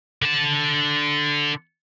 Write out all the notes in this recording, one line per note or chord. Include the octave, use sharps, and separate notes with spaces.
D3 A5